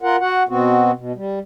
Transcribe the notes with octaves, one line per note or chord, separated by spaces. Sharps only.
F4 A#4 F#5
F#4 F#5
B2 B3 C4 F#4
B2
G3